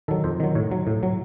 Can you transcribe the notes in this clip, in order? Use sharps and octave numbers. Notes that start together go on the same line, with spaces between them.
D#3 F#3 A4
F2 C5
D#3 F#3
A2 C#5
F#3
A2
F#3